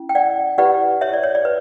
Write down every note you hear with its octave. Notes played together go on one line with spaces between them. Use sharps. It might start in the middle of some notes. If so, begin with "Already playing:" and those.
Already playing: C#4 E4
G5
D5 F#5
E4 G4 B4 D5 F#5
C#5 E5
D5
C#5
D5
B4